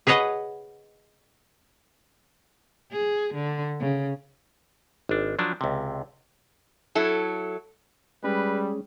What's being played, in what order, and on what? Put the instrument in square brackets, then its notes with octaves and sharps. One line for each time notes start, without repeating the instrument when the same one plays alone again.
[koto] G#4 B4 C#5 D#5 F#5
[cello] G#4
D3
C#3
[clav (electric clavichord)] G#1 D4
F3 F#3 D4
C#2 C3
[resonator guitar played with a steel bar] F#3 E4 A4
[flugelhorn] G3 [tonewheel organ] G#3 C#4 [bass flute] G#4 [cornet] B4